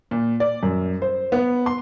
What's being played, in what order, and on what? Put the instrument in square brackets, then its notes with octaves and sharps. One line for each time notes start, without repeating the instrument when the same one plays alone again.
[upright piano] A#2
D5
F#2
C5
B3
C6